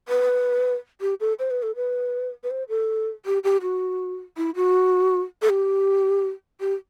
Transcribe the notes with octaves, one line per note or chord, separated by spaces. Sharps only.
B4
G4
A4
C5
B4
A4
B4
B4
C5
A4
G4
G4
F#4
E4
F#4
A4
G4
G4